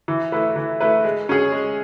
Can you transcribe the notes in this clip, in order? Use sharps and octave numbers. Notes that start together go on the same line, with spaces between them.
E3
A3 E4 B4
E3
A3 E4 B4
G#3
C#4 G#4
G#3